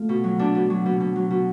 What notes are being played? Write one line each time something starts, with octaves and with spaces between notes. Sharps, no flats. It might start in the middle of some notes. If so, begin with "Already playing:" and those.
Already playing: A3 F4
B2
F#3
B2 D4
B2
F#3
B2
B2
F#3
B2